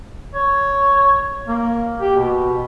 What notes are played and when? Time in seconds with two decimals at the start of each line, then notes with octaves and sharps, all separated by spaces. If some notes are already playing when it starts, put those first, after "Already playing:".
0.35 C#5
1.48 A#3
2.00 G4
2.16 B2